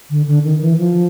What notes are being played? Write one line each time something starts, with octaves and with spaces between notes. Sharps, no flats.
D3
D3
D#3
E3
F3